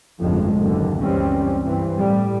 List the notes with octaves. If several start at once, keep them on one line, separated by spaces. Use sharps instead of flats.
G1 F2 A2 C#3 F3 G#3
F#1 D#2 D3
F#1 C#2 E3 G3 C4 C#4
G2 E3 C4
A2 G3